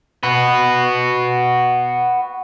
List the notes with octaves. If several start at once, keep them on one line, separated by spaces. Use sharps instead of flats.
F#4 B4